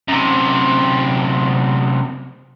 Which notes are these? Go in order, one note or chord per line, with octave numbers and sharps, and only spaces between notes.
F#2 C3